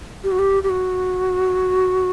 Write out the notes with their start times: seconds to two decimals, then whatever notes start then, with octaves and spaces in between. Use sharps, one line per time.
0.24 G4
0.32 F#4
0.39 G4
0.63 G4
0.70 F#4